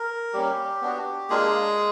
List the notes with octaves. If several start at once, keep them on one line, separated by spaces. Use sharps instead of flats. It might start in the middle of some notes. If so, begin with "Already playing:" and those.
Already playing: A#4
G3 A#3 C#4 G4
B3 D4 F#4
G#3 A#3 D4 F4 G#4